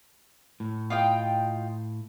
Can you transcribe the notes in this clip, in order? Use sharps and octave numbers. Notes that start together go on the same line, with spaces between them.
A2
F4 D#5 G5